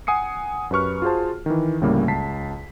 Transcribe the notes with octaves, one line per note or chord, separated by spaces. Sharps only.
F#5 G#5 D#6 C7 C#7
F#2 G4 B4 C#6 F6
F4 F#4 G#4 C5 A5
D#3 E3
D2 A2 C#3 G3 A3 A#3
C#2 A5 B6 C7